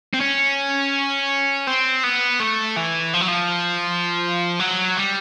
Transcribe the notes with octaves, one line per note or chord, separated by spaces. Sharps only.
C4
C#4
C4
B3
A3
E3
F3
F#3
F3
F#3
G3